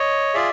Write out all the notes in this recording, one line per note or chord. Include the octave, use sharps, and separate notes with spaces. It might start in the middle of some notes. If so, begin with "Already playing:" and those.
Already playing: C#5 D#5
F4 G#4 D5 E5